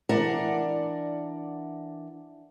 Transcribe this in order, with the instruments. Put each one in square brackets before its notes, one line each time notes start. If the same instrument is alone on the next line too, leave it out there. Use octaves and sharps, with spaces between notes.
[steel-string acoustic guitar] E3 D4 A#4 D5 F#5